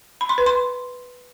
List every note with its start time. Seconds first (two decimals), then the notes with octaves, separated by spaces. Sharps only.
0.21 B5
0.29 C6
0.38 B4
0.46 C6